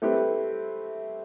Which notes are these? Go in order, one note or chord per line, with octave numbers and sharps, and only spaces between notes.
A3 C4 E4 G4 B4